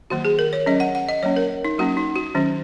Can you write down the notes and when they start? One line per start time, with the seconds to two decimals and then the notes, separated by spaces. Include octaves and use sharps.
0.10 D#3 F#3 A#3 F#4
0.25 G#4
0.39 A#4
0.53 C#5
0.66 F#3 C#4 D#5
0.80 F#5
0.95 F#5
1.09 D#5
1.23 F#3 A#3 C#4 C#5
1.36 A#4
1.65 D#4
1.78 F#3 A#3 C#4 F#4
1.97 D#4
2.15 F#4
2.35 D#3 F#3 C#4